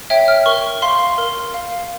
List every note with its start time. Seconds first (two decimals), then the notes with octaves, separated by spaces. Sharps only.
0.10 C#5 E5 G5
0.28 F6
0.46 A#4 C#6
0.82 F5 C6
1.18 A#4
1.54 F5